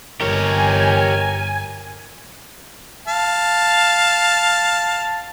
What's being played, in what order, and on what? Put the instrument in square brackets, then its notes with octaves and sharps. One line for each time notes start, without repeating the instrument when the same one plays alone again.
[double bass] G1 [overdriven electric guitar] G4 C#5 [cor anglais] A#4 [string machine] G#5
[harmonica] F5 A5